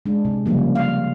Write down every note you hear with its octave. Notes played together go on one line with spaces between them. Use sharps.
G#3 D4
C3
C#3 F3 G3 A#3
F5